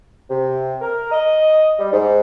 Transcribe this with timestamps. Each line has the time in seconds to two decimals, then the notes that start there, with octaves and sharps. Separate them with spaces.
0.29 C3
0.81 A#4
1.12 D#5
1.79 G3
1.92 G#2